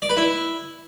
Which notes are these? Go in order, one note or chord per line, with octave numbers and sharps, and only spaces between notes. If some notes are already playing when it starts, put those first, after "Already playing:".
D5
B4
E4